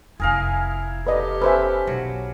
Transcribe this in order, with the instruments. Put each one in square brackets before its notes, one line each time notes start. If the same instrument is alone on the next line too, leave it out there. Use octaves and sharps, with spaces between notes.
[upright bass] F1 C4 [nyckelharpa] E4 [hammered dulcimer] G#4 A#4 F5
[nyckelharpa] G4 A4 [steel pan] B4 D5 D#5
[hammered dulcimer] C#4 [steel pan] B4 C5 E5
[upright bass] B1 [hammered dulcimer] F#3